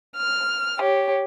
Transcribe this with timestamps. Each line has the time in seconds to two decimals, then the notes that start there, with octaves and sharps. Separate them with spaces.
0.17 F6
0.79 G4 C#5